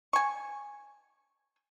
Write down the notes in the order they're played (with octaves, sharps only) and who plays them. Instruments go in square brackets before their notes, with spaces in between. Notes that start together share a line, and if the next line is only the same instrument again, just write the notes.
[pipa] G#5 C#6